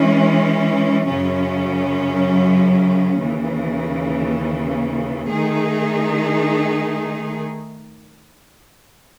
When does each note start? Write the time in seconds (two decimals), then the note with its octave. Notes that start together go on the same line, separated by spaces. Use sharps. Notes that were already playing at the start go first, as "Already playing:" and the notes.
Already playing: E3 G#3 C#4
1.07 F#2 C#3 F#3 C#4
3.18 D#2 C#3 E3
5.29 D#3 A3 D#4 G#4